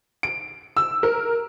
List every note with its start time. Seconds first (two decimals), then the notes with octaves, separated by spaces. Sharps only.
0.23 D7
0.77 E6
1.03 A#4